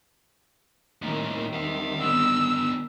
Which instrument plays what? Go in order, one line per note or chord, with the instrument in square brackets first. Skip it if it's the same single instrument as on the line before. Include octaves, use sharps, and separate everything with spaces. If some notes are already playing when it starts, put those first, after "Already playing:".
[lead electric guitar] A2 A#3 [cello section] D#3 G3 C4
[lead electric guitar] E5 F#5
[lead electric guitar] D3 B3 [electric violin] E6